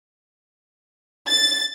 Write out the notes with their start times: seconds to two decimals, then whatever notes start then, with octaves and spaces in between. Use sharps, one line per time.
1.28 A6